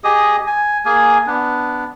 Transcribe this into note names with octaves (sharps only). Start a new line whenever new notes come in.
G4 G#4 D#5 D#6
G#5
A#3 G#4 G#5
B3 D4